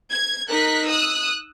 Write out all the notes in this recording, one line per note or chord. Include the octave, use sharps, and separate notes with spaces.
G#6
D#4 A#4 F#6 B6
D#6 E6 F#6